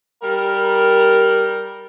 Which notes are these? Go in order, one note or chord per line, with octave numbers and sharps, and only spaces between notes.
G3 G4 A#4